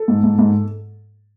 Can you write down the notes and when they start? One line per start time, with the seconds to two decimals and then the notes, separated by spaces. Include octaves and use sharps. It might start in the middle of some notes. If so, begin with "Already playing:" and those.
Already playing: A4
0.08 G#2
0.23 G#2
0.39 G#2